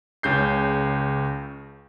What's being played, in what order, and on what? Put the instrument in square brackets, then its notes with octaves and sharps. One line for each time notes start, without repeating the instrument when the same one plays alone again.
[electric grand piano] C#2 C#3 G6 C7